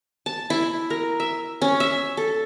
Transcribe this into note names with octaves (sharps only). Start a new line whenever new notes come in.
A5
E4
A#4
E5
C#4
E5
A4